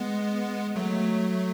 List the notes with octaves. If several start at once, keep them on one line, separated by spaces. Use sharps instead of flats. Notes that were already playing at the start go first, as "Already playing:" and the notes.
Already playing: G#3 B3
F#3 A3